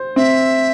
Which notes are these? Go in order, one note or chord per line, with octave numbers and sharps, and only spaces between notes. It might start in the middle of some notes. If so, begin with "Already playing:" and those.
Already playing: C5
C4 E5